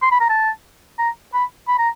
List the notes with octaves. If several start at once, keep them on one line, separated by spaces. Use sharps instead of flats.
C6
B5
A#5
A5
A#5
B5
B5
A#5